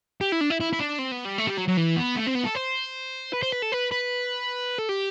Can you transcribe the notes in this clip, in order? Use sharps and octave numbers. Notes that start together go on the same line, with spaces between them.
G4
E4
D4
E4
E4
E4
D4
C4
B3
G3
A3
G3
F#3
F#3
E3
B3
A3
C4
B3
A4
C5
B4
C5
B4
A4
B4
B4
A4
G4